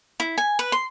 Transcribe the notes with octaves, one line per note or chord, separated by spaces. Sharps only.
E4
G#5
B4
C6